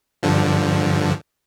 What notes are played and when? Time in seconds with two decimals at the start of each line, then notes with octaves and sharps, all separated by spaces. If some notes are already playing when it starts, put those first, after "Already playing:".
0.23 G2 D3 F3